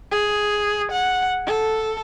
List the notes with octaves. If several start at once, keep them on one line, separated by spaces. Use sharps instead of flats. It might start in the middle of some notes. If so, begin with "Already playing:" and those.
G#4
F#5
A4